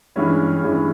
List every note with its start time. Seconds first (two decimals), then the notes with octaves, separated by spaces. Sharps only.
0.16 G2 E3 G#3 C#4 E4
0.63 G2 E3 G#3 C#4 E4